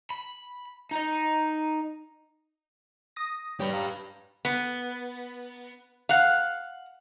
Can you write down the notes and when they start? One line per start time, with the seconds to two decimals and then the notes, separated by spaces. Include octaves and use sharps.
0.10 B5
0.91 D#4 D#5
3.16 D#6 A#6
3.60 G3 G4 B4 C#5 D5
3.73 F5 A#5
4.45 B3
6.09 F5 F#5